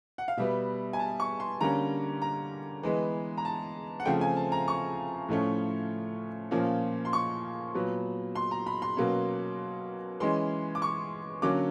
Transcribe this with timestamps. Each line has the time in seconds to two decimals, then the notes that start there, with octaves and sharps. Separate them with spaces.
0.18 F#5
0.28 F5
0.37 B2 G3 B3 E5
0.93 G#5
0.99 A5
1.20 C#6
1.40 C6
1.61 D3 G3 A#3 C#4 A#5
2.22 A#5
2.83 E3 G#3 B3
3.38 A#5
3.45 A5
4.00 F#5
4.05 C#3 F3 A3 C4 G5
4.21 G#5
4.36 A5
4.52 A#5
4.68 C#6
5.29 A2 F3 A3 C#4
6.51 A#2 F3 A#3 C#4
7.05 C6
7.13 C#6
7.74 A#2 F#3 B3
8.35 C6
8.51 A#5
8.67 B5
8.82 C6
8.97 B2 F#3 A#3 C#4
10.20 E3 G#3 C#4 C6
10.75 D6
10.82 C#6
11.42 D3 F#3 A#3 C#4 D6